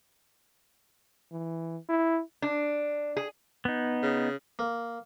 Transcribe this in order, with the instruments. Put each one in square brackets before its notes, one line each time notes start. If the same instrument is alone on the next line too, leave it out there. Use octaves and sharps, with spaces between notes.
[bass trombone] E3
E4
[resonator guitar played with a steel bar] D4
G#4
[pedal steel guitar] B3 D#4
[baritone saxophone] C#3
[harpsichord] A#3